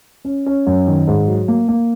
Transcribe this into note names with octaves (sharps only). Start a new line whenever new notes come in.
C#4
C#4
F#2
D#3
G#2
F#3
A#3
A#3